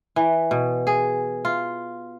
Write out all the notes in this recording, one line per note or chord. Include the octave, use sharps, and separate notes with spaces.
E3
B2
G#4
F4